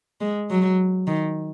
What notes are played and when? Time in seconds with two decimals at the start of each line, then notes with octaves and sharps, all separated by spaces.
0.21 G#3
0.50 F#3
1.07 D#3